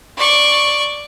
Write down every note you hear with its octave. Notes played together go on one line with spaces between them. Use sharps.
D5 C#6